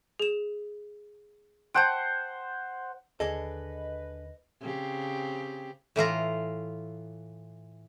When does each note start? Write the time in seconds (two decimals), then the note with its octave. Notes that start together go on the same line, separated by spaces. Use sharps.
0.19 G#4 E7
1.75 C5 F#5 G5 A5 C6 G6
3.20 D#2 D3 D4 G#4 A4 B4 D#5
4.61 C#3 C4 G4
5.96 A2 E3 F4 A#5